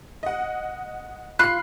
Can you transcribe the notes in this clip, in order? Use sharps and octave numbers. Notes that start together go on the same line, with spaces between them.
D#5 F#5
F4 B5 F#6 C7